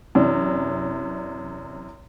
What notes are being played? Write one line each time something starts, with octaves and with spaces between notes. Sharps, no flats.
F#2 C3 E3 C#4 D4